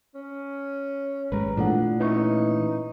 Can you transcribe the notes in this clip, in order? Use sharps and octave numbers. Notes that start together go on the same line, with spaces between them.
C#4
G#1 G#3 B4 A#5
A#2 E3 A3 D4 F4 A4 F#5
C#4 D#4 E4 B4 D#5 C#6